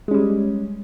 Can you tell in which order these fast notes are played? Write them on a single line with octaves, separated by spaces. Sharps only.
G#3 C#4 G3